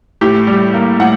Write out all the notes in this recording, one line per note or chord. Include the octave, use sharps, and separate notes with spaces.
A2 G4
G3
A#3
A2 F#5